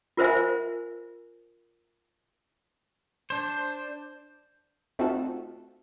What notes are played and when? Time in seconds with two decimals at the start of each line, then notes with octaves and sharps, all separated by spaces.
0.17 F4 A#4 C5 E5 G#5
3.30 D4 C5
4.99 A3 C4 D#4 F4 F#4 A4